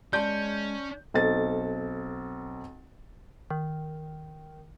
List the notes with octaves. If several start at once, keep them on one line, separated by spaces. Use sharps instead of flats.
G#3 C#4 D5 A5 C6 G6
B1 C4 A4 A6
D#3